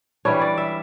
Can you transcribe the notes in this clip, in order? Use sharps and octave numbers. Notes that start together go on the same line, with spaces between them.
E3 G3 D4 C#5
D5
E5